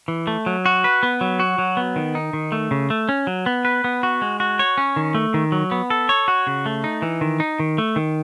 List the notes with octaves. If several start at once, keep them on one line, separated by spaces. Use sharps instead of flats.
E3
A3
F#3
F#4
B4
B3
F#3
F#4
F#3
B3
D#3
D#4
D#3
A3
C#3
A3
C#4
F#3
B3
B4
B3
F#4
G#3
F#4
C#5
C#4
D#3
A3
D#3
F#3
B3
A4
C#5
F#4
C#3
A3
D#4
E3
D#3
D#4
D#3
A3
D#3